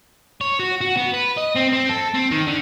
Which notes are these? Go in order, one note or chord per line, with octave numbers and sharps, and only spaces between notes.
C#5
F#4
F#4
B3
B4
D#5
C4
C4
A4
C4
D#3
D3